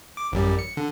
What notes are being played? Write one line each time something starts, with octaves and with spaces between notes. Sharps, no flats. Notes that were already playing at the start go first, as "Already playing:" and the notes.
D6
A1 F#2 G3
C#7
D3